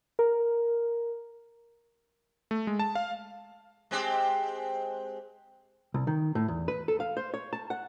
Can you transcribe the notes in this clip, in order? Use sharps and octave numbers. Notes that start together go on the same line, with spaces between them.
A#4
A3
G#3
A5
F5
G#3 C4 G4
C2
D#3
A2
E2
B4
A4
F5
C5
C#5
A5
F#5